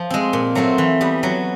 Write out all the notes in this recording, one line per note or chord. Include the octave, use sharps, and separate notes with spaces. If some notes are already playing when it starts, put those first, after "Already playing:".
Already playing: F3
G#3 C4
A#2
F#3 A3 C4 F4
E3
G3 B3
F#3